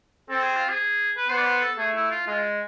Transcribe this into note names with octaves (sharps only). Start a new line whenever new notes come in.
C4 A4
G#4
F4
G#4
B4
B3 C5
D5
C5
A4
A3 G#4
E4
F4
G#3 F4